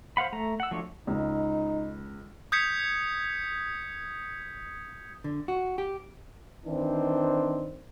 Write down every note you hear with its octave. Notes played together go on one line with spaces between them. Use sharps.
C5 F5 F#5 B5
A3 A#5
F#5 E6
F3 F#3 A3 D4 C#5
C#2 D#4
D#6 G6 G#6 B6 C#7
D3
F#4
G4
D#3 E3 C4 D4 C5